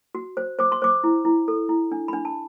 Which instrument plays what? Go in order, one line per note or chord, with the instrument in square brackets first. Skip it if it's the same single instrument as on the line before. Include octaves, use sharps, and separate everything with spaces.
[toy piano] F#4
C5
C5 D6
C6
C5 D6
E4
E4
A4
E4
D4
D4 B5
A5